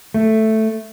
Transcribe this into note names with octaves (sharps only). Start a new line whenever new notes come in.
A3